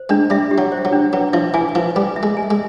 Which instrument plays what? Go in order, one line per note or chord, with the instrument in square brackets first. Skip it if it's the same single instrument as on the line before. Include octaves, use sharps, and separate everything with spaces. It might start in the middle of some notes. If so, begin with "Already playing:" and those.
Already playing: [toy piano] C5
[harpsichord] G#3 [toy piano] D4
[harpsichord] G3 [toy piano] E5
[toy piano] G4
[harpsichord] F#3
[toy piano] C5
[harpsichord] F#3
[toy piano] D4
[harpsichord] F#3 [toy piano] B4
[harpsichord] F3 [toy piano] E5
[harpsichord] E3 [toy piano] G#5
[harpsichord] F3 [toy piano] B4
[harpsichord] G3 [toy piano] B4
[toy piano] E5
[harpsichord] G#3
[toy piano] G#5
[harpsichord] G#3